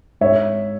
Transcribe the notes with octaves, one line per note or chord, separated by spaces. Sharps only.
G#2 C#5 E5